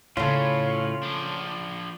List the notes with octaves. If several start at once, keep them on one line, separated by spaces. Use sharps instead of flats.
A2 C#3 A3 C#4 F4
F3 D4